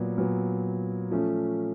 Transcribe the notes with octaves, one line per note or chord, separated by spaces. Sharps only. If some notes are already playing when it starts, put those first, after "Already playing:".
Already playing: A#2 F#3 B3
A#2 F#3 B3
F3 A3 C#4